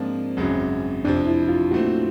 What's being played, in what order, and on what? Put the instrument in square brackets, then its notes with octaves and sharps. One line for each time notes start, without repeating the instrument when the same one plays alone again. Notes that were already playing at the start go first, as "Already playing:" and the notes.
Already playing: [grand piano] G#2 F3 A#3 D4 F4 [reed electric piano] C4
[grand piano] G#1 F#2 C#3 F#3
[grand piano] F2 C3 F3 [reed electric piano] D4
[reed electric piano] E4
F4
[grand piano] A#2 F#3 A3 C4 [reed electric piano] F#4